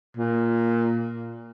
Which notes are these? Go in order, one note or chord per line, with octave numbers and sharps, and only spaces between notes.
A#2